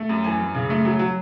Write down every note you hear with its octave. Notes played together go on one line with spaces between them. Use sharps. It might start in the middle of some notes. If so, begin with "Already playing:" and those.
Already playing: A3
F#2
E3 G#5
F#2
C#3
A3
F#3
F#3